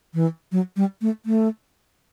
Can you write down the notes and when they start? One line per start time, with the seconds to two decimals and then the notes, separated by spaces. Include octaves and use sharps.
0.14 E3
0.52 F#3
0.76 G3
1.02 A3
1.26 A3